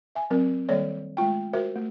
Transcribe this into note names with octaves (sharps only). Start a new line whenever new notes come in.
E5 G#5
F#3 C4 A#4
D#3 G3 A#3 A4 C#5 D5
G#3 A3 F4 G5
F#4 A#4 C5 E5
A3